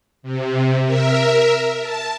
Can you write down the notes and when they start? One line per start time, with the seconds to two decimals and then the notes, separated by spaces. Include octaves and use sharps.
0.23 C3
0.84 A#4 E5
1.80 A5